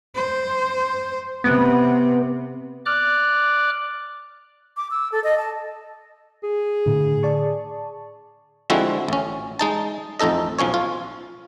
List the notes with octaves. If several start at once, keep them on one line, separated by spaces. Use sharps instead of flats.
C5
C3 B3
D5 D6 F6 F#6
D6
E6
A4
D#5
A5
G#4
A2 D3
D5 A5 C#6
D3 F3 G#3 C4 E4 F#4
A1 C#4
G#3 D#4 A5
A1 F2 D#4 A4 D#5
B1 F3 C#4 C#5
F4